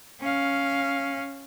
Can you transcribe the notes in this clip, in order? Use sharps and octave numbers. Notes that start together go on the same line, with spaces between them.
C#4 F5